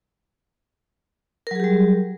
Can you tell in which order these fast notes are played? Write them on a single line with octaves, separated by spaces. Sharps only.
A#4 F#3 G#4 G4 G3